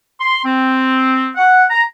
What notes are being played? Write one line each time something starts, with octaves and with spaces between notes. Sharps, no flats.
C6
C4
F#5
A#5